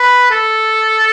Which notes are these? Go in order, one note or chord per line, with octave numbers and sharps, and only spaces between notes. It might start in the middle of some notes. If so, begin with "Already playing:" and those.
Already playing: B4
A4